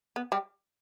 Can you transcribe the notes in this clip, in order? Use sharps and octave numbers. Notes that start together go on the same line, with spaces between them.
B3
G3 G4